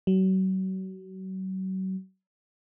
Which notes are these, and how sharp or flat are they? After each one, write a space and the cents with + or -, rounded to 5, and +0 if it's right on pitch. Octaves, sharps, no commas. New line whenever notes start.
F#3 +35